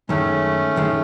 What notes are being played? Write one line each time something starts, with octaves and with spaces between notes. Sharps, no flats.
F#2 D#3 G#3 A3 C#4
F#2 D#3 G#3